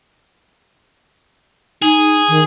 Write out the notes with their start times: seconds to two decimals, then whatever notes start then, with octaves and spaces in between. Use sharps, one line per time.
1.82 D#4 G#4
2.29 D#3